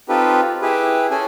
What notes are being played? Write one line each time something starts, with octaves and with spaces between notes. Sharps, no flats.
C4 D#4 F4 G4 A4 B4
E4 G4 G#4 B4
C#4 G#4 A4 G#5